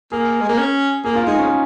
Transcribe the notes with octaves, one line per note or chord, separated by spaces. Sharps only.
A#3 G#4
G#3
A#3
C#4
A#3 G#4
F4
G#3 D#4
C#4